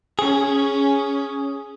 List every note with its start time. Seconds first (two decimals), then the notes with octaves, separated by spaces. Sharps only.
0.19 C#4 G#4